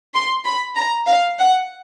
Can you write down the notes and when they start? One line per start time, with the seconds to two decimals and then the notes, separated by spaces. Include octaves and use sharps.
0.14 C6
0.45 B5
0.76 A#5
1.07 F5
1.39 F#5